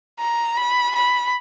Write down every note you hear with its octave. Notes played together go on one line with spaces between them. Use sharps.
A#5
B5
B5